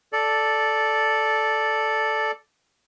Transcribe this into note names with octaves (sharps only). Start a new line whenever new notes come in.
A4 D5